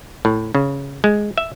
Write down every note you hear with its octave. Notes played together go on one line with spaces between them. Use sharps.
A2
C#3
G#3
E5